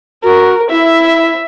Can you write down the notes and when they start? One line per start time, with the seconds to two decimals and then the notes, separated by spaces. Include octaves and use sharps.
0.24 F#4 A#4
0.70 E4 E5